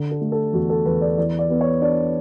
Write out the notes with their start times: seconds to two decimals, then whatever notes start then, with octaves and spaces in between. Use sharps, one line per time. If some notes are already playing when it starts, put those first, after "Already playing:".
Already playing: D3
0.11 A4
0.21 A3
0.32 A4
0.53 E2 F#4
0.70 A4
0.86 E2 B4
1.01 D5
1.18 E3 D5
1.39 D5
1.50 B3
1.61 C#5
1.81 D4 D5